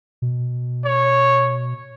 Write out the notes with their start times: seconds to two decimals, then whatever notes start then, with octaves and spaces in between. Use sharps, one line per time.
0.22 B2
0.85 C#5